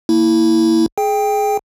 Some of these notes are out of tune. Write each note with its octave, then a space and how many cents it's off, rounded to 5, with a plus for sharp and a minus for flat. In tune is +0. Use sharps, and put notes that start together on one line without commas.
A#3 -20 E4 -10
G#4 +20 G5 +15